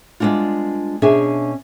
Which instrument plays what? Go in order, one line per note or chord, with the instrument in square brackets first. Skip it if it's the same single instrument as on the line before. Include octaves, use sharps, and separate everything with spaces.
[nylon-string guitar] G3 G#3 B3 C4 D4 F4
B2 C#4 D4 G#4 E5 G#5